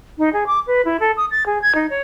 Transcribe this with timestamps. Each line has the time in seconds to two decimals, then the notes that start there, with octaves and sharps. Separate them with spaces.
0.18 D#4
0.33 G#4
0.46 D6
0.67 B4
0.85 E4
1.00 A4
1.17 D#6
1.31 A6
1.46 G#4
1.61 G#6
1.75 D#4
1.90 C#5